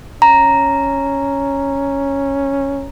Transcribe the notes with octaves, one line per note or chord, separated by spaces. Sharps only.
C#4 A#5